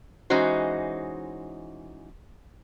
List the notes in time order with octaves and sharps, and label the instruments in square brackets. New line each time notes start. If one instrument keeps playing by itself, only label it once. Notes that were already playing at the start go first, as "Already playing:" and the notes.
[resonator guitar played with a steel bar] E3 G#3 C#4 D#4 F#4 C5